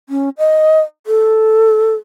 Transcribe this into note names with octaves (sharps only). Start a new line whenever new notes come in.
C#4
D#5
A4